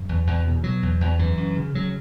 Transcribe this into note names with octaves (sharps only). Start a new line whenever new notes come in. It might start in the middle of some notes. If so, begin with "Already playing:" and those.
Already playing: F#2
E2
E2
B2
B2 F#3
E2
E2
F#2 E3
F#2
C#3
C#3 F#3